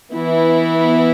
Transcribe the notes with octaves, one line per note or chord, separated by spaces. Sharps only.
E3 B3 E4